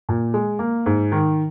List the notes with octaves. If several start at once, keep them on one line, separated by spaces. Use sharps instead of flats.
A#2
G#3
A#3
G#2
D#3